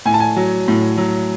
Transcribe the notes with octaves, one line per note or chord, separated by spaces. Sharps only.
A2 G#5
A5
G#5
F#3
A2
F#3